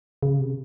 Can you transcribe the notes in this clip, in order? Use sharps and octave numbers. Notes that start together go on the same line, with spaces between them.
C#3
C3